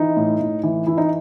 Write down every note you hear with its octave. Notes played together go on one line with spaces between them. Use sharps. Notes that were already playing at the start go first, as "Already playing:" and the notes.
Already playing: E3 D#4
A2
A2
E3
E3 E4
D#4